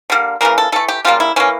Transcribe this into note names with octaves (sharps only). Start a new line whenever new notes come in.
D3 G3 A#3
C#3 E3 A#3 A#4
A4
E3 A3 A4
G4
C#3 G3 A#3 F4
E4
E3 A#3 C#4